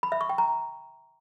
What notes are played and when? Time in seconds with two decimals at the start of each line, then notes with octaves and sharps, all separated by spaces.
0.03 B5
0.12 E5
0.21 C#6
0.29 G5
0.38 A#5